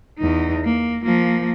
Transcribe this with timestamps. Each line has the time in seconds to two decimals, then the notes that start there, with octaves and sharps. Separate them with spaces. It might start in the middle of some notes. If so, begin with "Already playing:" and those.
0.19 E2 D#4
0.65 A#3
1.04 F3 A#3